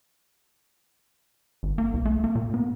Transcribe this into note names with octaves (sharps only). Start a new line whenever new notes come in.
G#1
A#3
C2
A3
A#3
A#2
B3